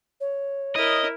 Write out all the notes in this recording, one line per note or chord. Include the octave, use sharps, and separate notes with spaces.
C#5
E4 A#4 D#5